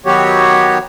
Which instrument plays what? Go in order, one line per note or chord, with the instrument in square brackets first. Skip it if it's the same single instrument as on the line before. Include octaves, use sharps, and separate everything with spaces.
[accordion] D#3 F#3 B3 F#4 G4 C#5